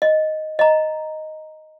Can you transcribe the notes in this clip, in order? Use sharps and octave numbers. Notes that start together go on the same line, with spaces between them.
D#5
D#5 A#5